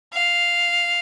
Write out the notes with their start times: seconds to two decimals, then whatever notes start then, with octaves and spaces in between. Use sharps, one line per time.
0.13 F5